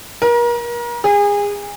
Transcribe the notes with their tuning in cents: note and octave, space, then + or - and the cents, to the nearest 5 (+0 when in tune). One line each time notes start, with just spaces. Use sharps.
A#4 +35
G#4 -30